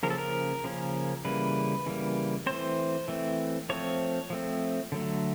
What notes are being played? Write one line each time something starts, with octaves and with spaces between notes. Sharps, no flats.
C#3 F3 A#3 C#4 A#4
A4
A#4
C#3 F3 A#3 C#4
C#3 E3 G3 A#3 B4
C#3 E3 G3 A#3
E3 A3 C4 C5
E3 A3 C4
F3 A3 C4 C#5
F3 A3 C4
D3 F#3 A3